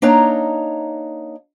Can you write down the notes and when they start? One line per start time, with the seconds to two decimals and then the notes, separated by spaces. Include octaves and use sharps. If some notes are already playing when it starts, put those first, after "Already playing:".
0.02 A#3 D4 D#4 C#5 A#5